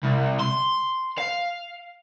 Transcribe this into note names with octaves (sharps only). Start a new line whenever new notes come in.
C2
C6
F5